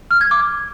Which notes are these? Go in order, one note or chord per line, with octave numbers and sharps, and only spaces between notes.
F6
G#6
D6
G#6